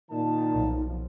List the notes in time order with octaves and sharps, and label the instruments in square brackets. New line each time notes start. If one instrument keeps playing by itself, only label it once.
[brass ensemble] A#2 D#3 A5 [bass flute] D#4
[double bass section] B1 F3